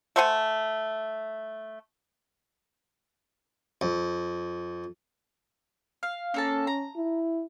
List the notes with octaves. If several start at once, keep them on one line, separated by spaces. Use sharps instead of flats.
A3 C5 F#5 G#5
F2
F5
A#3 C#4 A4 A5
A#5
E4